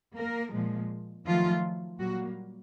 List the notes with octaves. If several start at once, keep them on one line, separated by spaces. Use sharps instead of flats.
A#3 A#4
A#2 F3 G#3
D#3 F3 F#3 A3 F4
A#2 F#3 G3 A#3 F#4